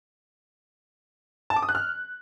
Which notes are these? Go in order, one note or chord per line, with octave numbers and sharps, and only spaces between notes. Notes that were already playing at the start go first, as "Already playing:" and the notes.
A5
D6
D#6
F#6
F6